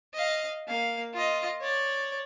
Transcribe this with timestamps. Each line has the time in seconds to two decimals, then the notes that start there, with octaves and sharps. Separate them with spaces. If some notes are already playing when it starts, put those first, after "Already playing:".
0.14 D#5 F5
0.67 A#3 F5
1.13 F4 D#5
1.61 C#5 D5